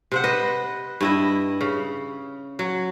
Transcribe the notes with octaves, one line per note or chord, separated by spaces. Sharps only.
C3 C5 F#5
B4 D#5
G2 E4 D#5
C#3
F#3